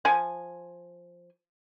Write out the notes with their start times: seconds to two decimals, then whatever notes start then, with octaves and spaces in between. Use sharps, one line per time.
0.05 F3 G#5